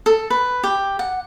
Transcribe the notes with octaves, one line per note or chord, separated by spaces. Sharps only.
A4
B4
G4
F#5